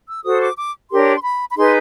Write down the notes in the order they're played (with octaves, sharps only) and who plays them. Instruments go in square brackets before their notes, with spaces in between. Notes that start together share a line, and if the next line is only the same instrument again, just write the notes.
[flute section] E6
F#4 A4 C5 D#6
D6
D6
D4 G4 A#4 C#5 C6
C6
B5
B5
D#4 G#4 B4 C6